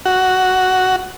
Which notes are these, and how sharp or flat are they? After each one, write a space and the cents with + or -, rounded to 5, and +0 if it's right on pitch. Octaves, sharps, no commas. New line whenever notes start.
F#4 +5